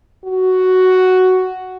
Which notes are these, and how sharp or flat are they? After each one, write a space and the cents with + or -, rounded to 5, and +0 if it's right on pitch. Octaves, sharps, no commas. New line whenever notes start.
F#4 +5